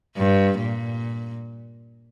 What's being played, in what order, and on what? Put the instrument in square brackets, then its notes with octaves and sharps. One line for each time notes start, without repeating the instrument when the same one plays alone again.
[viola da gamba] G2
A#2